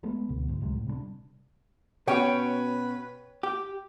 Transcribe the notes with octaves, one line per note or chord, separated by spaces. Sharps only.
F#3 G#3 A3 B3
C#2 B2 D3
D2 G#2
C#2 C3 F#3 G#3
A2
C3 G3 G#3 D4
B2 C#4 F#4 B4 C#5 G5
G4